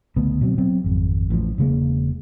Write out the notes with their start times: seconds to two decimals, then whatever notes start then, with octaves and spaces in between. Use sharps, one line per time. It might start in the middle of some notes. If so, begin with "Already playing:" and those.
0.16 C#2 D3 A3 B3
0.41 B2 F#3 C4
0.58 F#3 B3 C4
0.84 G#1 F2
1.30 A1 A2 D3 F3
1.58 E1 C#3 G#3 A#3